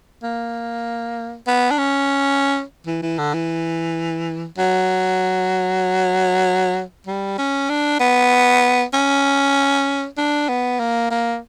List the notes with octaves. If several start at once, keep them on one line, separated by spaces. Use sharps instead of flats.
A#3
B3
D4
C#4
E3
E3
D3
E3
F#3
G3
C#4
D4
B3
C#4
D4
B3
A#3
A#3